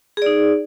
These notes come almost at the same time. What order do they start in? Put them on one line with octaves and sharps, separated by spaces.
G#4 D5 D#4